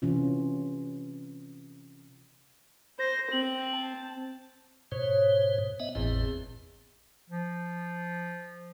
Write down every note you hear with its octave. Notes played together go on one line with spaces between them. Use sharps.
C3 E3 C#4 F4
C5 A#6
C4 F#7
A5
G#2 B2 C5 C#5
B3 D#5 E5
G#1 E2 A2 C4
F3